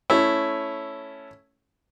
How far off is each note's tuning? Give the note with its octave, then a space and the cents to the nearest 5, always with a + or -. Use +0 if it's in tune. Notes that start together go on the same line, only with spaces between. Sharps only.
A3 +0 C#4 +0 E4 +0